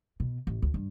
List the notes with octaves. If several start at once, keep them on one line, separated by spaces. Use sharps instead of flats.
B2
A1
D2
G2